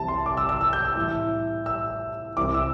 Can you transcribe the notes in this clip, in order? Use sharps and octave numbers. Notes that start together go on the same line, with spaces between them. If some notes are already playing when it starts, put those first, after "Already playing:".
Already playing: C2 C3 E3 G3 A5
C6
D6
E6
E6
E6
G6
E6
A2 E3 G3
E6
C2 C3 E3 D6
E6